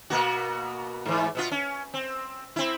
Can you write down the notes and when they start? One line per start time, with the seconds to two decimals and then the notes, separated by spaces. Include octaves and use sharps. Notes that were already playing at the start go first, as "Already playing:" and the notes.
0.10 B2 A#3 F#4
1.05 G#2 E3
1.35 B2 B3 F4
1.51 C#4
1.94 C4
2.56 C4 E4